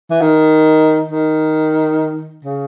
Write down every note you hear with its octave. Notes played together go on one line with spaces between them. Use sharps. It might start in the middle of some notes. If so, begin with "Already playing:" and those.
E3
D#3
D#3
C#3